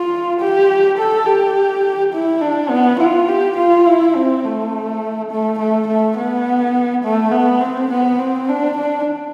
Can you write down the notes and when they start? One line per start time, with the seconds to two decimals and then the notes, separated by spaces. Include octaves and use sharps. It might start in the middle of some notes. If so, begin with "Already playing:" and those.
Already playing: F4
0.40 G4
0.98 A4
1.26 G4
2.13 E4
2.41 D4
2.70 B3
3.00 F4
3.28 G4
3.57 F4
3.86 E4
4.16 C4
4.44 A3
5.31 A3
5.59 A3
5.88 A3
6.18 B3
7.04 A3
7.32 B3
7.61 C4
7.91 B3
8.19 C4
8.49 D4
8.77 D4